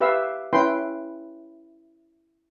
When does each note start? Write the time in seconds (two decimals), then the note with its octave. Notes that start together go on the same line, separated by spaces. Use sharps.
0.01 G4 B4 E5 F5 E6
0.53 C#4 E4 B4 G5 C6